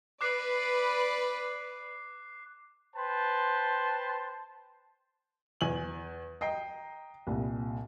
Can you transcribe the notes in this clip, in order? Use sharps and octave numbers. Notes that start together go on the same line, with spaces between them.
B4 D5 D6 F#6 C7
B4 C5 G5 A5 C6
E2 G#5 F#7
D#5 G5 A#5 C7
C2 A#2